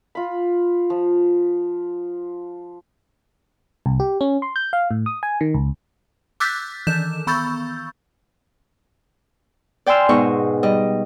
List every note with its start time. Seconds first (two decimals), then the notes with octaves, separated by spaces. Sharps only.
0.15 F4 B5
0.90 F3
3.86 C2
4.00 G4
4.21 C#4
4.42 C6
4.56 G6
4.73 F5
4.91 A2
5.06 D#6
5.23 G#5
5.41 D#3
5.54 C#2
6.40 D6 E6 F#6 G6 A6 B6
6.87 D#3 E3 G6 E7
7.27 B3 B5 C#6 E6 G6 A6
9.86 D5 G5 G#5 C6 E6 F6
10.09 G#2 B2 D#4 D#5 C#6 E6
10.63 G3 D#5